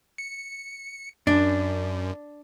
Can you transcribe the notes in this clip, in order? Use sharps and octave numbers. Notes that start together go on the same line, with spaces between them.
C#7
F#2 D4